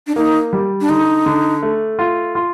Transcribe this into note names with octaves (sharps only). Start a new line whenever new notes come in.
D4
A#3 D#4
G3
D4
D3 D#4
D3
A3
F4
F4